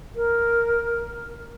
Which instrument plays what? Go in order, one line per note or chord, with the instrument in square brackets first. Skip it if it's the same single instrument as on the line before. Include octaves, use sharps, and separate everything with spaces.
[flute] A#4